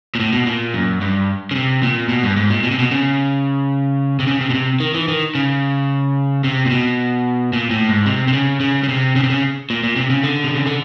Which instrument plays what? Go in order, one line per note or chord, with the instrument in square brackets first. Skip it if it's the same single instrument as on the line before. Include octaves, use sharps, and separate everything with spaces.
[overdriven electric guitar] A#2
A2
B2
A#2
F#2
G2
C#3
C3
A#2
B2
G2
G#2
A#2
B2
C3
B2
C#3
C3
C#3
C3
B2
C3
D#3
E3
D#3
C#3
C3
A#2
B2
A#2
A2
G#2
C3
C3
C#3
C#3
C#3
C3
C#3
C3
C#3
A#2
A#2
C3
C#3
D3
C3
C#3
D3